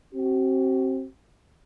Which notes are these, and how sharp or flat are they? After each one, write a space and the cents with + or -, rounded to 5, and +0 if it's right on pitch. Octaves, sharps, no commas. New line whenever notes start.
C4 +20 F#4 +45